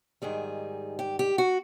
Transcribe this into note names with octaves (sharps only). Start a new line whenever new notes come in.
G#2 D#3 G3 G#4
G4
G4
F#4